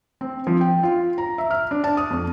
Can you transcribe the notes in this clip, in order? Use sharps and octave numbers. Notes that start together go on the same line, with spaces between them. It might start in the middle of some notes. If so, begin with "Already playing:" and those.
C4
F3
G5
F4
A#5
E5
F6
D4
A5
D#6
F2